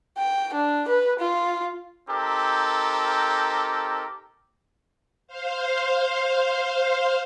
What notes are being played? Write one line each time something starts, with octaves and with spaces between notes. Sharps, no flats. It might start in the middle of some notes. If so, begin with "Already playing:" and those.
G5
D4
B4
F4
C4 D#4 G4 A4 A#4
C5 F5